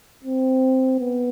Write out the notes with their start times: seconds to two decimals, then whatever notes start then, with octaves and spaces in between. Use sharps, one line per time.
0.24 C4
0.99 B3